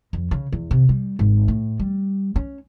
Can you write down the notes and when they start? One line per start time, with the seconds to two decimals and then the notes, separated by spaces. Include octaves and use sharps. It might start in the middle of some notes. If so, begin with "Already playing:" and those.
0.13 F2
0.31 C#3
0.52 E2
0.71 C3
0.89 G3
1.19 G#1
1.48 A2
1.79 G3
2.36 C#4